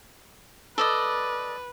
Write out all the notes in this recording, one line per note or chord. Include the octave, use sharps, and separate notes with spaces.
A4 B4 D5 D#5